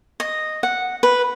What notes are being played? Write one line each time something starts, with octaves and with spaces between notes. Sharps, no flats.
D#5
F#5
B4